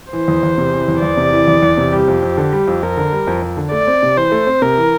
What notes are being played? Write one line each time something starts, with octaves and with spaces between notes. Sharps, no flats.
E3 C5
E2
E2
C3
E3
E2
E2 D5
C3
E3
E2
E2
C3
G3 G4
F2
F2
D3
G3
F2
F2 A#4
D3
G3
F2
F2
D3
A3 D5
C4
C3
E3 C5
A3
C4
C3 A#4
E3